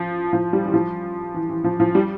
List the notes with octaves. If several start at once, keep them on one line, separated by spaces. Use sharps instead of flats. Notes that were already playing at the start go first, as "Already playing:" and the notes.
Already playing: F3
F3
G3
E3
F3
E3
E3
F3
F3
G3